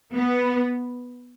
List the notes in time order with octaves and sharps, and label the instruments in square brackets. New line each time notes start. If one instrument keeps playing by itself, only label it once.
[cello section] B3